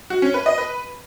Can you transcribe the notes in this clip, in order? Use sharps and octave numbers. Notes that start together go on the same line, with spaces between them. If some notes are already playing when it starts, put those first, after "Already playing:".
F#4
C#4
B4
D#5
B4